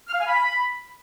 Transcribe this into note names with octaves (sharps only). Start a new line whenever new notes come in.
F6
F5
G#5
B5